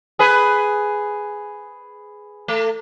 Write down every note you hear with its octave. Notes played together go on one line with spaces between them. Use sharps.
G#4 B4
A3